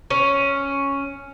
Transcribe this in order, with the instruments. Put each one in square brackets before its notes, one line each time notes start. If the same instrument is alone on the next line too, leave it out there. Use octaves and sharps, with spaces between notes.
[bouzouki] C#4